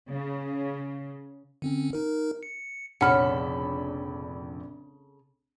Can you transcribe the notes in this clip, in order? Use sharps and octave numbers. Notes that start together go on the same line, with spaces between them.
C#3
D3 C4 C#4
D#4 A#4
C#7
F1 A#1 C#3 A4 F#5 B5 F6